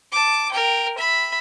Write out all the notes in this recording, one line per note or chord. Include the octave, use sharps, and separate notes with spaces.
A5 D6
A#4 G5
E5 B5